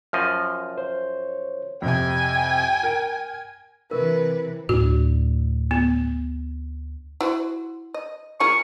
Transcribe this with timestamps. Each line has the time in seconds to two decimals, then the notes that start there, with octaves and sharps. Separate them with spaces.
0.13 F#2 F3 D#5 F6
0.78 C5 C#5
1.82 F2 C3 G5 G#5
2.83 A#4 D7
3.91 C3 E3 A#4 B4
4.69 D2 A2 C4 D4 F#4
5.71 B3
7.21 E4 F#4 C5
7.94 D#5
8.40 A#3 F4 G#4 C#6